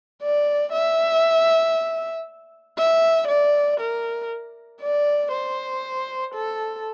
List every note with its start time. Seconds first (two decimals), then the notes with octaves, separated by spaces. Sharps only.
0.23 D5
0.72 E5
2.78 E5
3.28 D5
3.80 A#4
4.81 D5
5.32 C5
6.34 A4